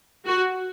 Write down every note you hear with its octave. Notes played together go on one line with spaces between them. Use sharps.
F#4